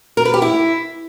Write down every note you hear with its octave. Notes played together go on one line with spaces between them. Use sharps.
A#4
B4
G4
E4